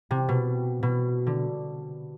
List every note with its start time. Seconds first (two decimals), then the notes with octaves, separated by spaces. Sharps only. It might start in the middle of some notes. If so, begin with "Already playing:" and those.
0.11 C3
0.29 B2
0.83 B2
1.27 D3